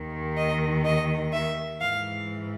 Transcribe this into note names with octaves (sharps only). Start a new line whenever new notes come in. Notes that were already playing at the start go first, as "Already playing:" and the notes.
Already playing: D#2 D#3
D#5
D#5
E5
G#2 E3 F5